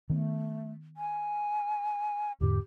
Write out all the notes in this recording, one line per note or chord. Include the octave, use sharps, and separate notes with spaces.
D#3 A3 B3
G#5
E2 G#2 D3 G4